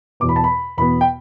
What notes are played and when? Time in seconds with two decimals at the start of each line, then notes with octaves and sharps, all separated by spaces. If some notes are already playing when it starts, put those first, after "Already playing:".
0.20 E2 B2 B3 D6
0.29 B5
0.36 A5
0.44 B5
0.77 E2 B2 B3 B5
1.01 G5